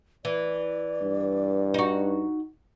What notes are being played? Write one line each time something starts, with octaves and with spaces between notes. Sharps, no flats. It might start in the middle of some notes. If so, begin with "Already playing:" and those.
E3 D5
G2
D#4 F#4